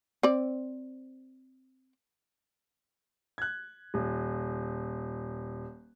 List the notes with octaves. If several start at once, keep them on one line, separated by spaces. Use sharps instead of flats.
C4 D5
F#6 G#6
D#1